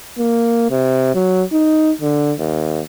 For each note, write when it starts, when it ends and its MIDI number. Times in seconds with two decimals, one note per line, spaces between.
0.18 0.67 58
0.70 1.11 48
1.14 1.42 54
1.52 1.91 63
2.01 2.32 50
2.39 2.80 39